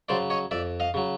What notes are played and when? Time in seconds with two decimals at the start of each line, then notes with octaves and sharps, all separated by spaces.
0.09 C#3 F#3 C5 D5
0.30 C#5 D#5
0.51 F2 D5 E5
0.80 D#5 F5
0.94 C#3 F#3